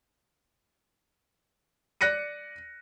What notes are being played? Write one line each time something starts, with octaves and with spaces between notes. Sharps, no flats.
D5 F#6 A#6 C#7 D#7